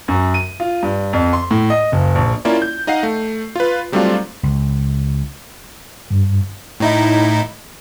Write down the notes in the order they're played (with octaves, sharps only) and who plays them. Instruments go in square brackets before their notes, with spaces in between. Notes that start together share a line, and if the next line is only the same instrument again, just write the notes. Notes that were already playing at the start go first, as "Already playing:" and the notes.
[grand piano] F#2
D#7
F4
G2
F2
C6
A2
D#5
F#1
A#1
[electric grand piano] A#3 C#4 E4 F4 D5
G6
D#4 D#5 F5 F#5 C7
A3
F4 B4
F#3 G3 A3 C4 D4 F4
[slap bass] C#2
[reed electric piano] G2
[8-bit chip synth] A2 D#4 E4